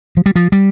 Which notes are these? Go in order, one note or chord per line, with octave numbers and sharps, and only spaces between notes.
F3
G3
F3
G3